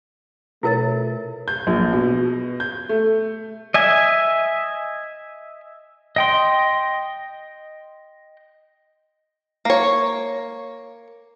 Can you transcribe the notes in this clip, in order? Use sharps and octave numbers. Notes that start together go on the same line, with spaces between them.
B2 A3 E4 F4 A#4 C#5 A6
G6
A#1
B2
G6
A3
D#5 E5 G#5
D#5 G5 C6
A#3 C#5